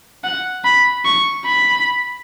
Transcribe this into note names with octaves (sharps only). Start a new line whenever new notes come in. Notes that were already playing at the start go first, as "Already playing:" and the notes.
F#5
B5
C#6
B5